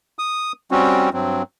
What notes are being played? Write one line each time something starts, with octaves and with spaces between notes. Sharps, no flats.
D#6
G3 C4 C#4 F#4
G2 F#3 C4